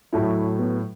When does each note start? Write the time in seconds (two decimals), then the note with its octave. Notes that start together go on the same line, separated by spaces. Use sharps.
0.13 A2 F#3 E4
0.59 B3